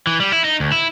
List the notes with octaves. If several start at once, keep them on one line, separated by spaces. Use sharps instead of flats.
E3
G3
E4
D#4
D2
E4